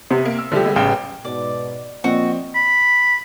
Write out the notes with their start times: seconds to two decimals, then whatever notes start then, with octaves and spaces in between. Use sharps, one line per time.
0.11 C3 B3
0.25 A#3
0.39 E6
0.52 D3 F3 G3 A3 G4
0.64 G3 G#3 B3
0.76 A1 C#3 G5
1.25 G#2 B2 D5
2.04 A#2 F3 C4 F#4 D5 D#5
2.55 B5